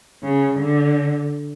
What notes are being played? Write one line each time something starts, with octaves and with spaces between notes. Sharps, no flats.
C#3
D3